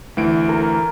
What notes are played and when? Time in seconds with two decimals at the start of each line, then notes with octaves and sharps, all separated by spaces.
0.17 D2 E3 D7
0.49 A#4